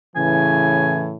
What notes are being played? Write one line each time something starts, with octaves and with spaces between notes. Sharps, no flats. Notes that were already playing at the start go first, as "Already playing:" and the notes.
A2 C#3 E3 G#5